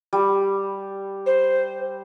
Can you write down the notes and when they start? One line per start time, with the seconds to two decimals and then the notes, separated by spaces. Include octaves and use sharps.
0.13 G3
1.26 C5